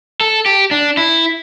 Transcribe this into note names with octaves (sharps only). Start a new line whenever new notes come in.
A4
G4
D4
E4